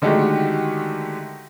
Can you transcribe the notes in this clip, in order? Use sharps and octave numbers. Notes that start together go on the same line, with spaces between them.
D3 D#3 G#3 A3 F#4 G4